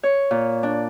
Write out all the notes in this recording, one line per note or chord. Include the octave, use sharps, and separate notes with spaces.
C#5
A#2
D4